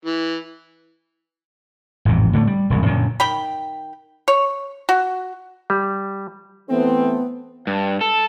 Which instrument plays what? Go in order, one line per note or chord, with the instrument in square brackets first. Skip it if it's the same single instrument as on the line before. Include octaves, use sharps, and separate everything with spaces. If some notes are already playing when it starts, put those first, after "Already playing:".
[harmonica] E3
[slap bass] A1 F2 G#2 C3
A2 D3 F#3 A3
G3
E1 C2 G#2
F#2 A#2 D3
[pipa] D#3 G5 B5
C#5
F#4
[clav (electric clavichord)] G3
[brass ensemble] E3 A3 C4 [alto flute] B3
[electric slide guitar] G2
A4